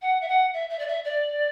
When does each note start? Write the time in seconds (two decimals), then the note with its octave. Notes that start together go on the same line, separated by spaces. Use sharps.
0.02 F#5
0.21 E5
0.28 F#5
0.53 E5
0.70 E5
0.79 D5
0.88 E5
1.04 D5